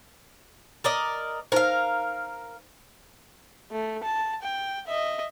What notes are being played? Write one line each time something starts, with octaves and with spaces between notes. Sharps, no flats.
A#4 D5 D#5
D#4 A#4 C5 F5
A3
A5
G5
D#5 E5